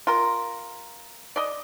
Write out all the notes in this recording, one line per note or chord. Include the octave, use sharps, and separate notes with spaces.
F4 A#4
D5 D#5